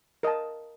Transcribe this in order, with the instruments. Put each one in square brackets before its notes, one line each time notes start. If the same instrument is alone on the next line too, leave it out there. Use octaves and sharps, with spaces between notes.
[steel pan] A#4 D#5 A5